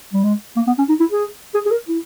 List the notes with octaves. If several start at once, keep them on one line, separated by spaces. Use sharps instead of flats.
G3
G#3
A#3
B3
C#4
D#4
E4
G#4
G#4
G#4
A#4
E4